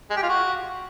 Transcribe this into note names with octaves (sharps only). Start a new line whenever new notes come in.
G#3
G4
F4
F#4